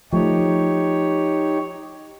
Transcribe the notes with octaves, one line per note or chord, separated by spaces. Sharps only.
F3 A3 D#4 G4 C#5